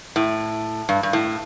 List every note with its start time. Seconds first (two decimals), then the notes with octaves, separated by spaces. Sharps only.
0.16 A2
0.89 G2
1.03 G2
1.13 A2